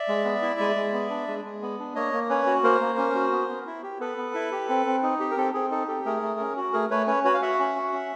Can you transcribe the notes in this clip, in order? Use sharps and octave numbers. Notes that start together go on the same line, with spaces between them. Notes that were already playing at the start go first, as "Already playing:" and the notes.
Already playing: D5 E5
G#3
B3
E4
G#3
G#3
B3
D4
G#3
G#3
B3
D4
A#3 C#5 D#5
A#3
C#4 B4 C#5
F#4
A#3 A#4 C5
A#3
C#4
F#4
B3
B3
E4
G4
B3 A4 B4
B3
E4
G4
C4
C4
D#4
G4
A#4
C4 A4
C4 G#4
D#4 A4
G4 A4
A3 G#4 A#4
A3
C#4
F#4
A3 G#4 A#4
A3 B4 C#5
C#4 B4 C#5
F#4 B4 C#5
F5
F#4 E5 F#5
C#4
F#4
C#4